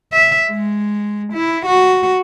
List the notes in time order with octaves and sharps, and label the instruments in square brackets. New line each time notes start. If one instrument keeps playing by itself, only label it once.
[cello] E5
G#3
E4
F#4